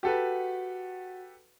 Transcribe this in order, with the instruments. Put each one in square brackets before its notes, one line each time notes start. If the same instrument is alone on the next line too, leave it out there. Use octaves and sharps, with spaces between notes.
[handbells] F#4 F#5 [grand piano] G4 A4 B4